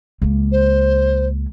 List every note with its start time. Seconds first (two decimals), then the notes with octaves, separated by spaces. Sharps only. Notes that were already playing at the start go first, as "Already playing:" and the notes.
0.22 C#2 A#3
0.51 C5